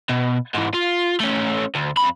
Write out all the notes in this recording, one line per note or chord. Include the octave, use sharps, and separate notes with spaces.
B2
G#2 E3
F4
A3 C#4
D2
F2 B5